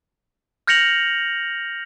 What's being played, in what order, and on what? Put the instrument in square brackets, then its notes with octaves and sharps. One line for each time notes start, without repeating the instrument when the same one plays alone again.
[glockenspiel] F6 G6 A#6 C#7 F7 F#7